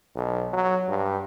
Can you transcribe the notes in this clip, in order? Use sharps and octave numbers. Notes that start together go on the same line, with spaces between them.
B1
F#3
G2